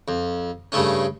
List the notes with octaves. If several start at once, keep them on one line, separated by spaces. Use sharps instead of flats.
F2
G2 C#3 A3 C#4